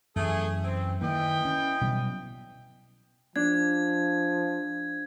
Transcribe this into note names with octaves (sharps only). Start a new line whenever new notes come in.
F#2 E3 A3 G#4
C4
D#3 E3 A#3 D#5 G5
C#4
B2 F#3 G3
F3 D4 G#6